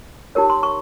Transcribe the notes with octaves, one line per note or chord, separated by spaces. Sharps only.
D#4 G4 A#4 C#5
C6
C#6